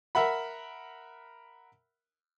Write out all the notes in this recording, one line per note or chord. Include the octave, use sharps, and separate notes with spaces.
A#4 E5 F#5 B5